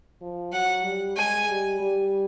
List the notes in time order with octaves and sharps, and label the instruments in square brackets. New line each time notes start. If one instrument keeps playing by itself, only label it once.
[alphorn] F3
[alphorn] F#3 [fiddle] F#5
[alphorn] G3
[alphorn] G#3 [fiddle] G#5
[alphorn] G3
G3